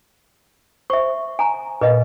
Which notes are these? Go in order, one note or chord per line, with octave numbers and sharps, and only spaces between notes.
C5 E5 C#6
G#5 A#5
A#2 B4 D#5 F5